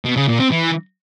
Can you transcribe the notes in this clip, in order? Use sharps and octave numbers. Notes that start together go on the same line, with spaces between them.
B2
C#3
A#2
C4
E3